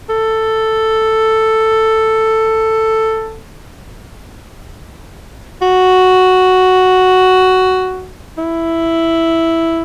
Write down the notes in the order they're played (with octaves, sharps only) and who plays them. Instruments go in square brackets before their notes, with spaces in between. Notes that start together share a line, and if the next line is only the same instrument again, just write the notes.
[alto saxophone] A4
F#4
E4